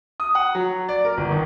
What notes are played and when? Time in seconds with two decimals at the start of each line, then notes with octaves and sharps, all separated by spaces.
0.20 D#6
0.35 F#5
0.55 F#3
0.88 D5
1.05 A#4
1.17 G1
1.31 D#3